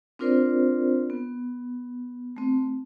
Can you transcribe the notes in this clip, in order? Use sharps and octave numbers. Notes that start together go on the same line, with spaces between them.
C4 D4 F4 A#4 C5 D5
B3
A3 C4